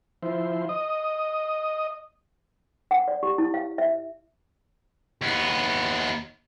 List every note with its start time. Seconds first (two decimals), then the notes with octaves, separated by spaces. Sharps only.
0.23 F3 E4 C5
0.69 D#5 D#6
2.91 F#5
3.08 D5
3.23 G4
3.38 E4
3.54 F5
3.78 E5
5.22 D#2 B3